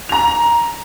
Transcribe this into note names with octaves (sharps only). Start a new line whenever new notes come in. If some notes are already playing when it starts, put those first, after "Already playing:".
A#5 F7